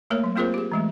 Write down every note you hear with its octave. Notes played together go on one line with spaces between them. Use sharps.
A3 A#3 A#4 C#5
F#3
A#3 C4 F4 G#4 A#4 C5
G4 G#4
E3 G#3 A3